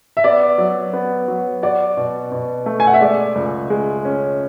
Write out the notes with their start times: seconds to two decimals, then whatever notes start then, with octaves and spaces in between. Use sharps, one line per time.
0.17 E5
0.24 B3 D5
0.58 F#3
0.93 B3
1.28 F#3
1.63 F#4 D5
1.97 B2
2.32 B2
2.66 A3
2.80 G#5
2.87 F#5
2.94 E5
3.01 G#3 D5
3.35 C#2
3.70 G#3
4.05 C#4